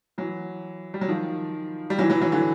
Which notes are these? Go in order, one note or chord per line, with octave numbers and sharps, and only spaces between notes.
E3 F#3
G3
F#3
D#3 F3
G3
E3 F#3
E3 F#3
E3 F#3
D3 E3